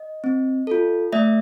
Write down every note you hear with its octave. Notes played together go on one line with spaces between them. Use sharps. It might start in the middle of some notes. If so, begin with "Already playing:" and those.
Already playing: D#5
C4
F4 A4
A3 D5 E5